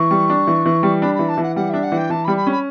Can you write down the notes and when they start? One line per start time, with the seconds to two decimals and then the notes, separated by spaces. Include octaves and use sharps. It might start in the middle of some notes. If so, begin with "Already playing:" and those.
Already playing: E3 C#6
0.11 G3
0.30 D4
0.47 E3
0.65 E3
0.83 G3
1.01 D4 B5
1.14 E3 B5
1.28 A5
1.38 E3 F#5
1.55 G3 F#5
1.69 D4 E5
1.83 F#5
1.92 E3
1.97 G5
2.10 E3 A5
2.24 B5
2.28 G3
2.37 B5
2.47 C#4 B5